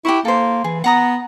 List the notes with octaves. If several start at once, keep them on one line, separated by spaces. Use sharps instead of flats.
E4 G4 F#5 C#6
A#3 A4 C5
E3 G#4
B3 F#5 A#5 D#6